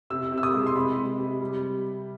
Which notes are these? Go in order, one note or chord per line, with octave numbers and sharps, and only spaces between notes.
C3 E6
C3
E6
D#6
G#3
C6
C3 B5
C3
C3
G3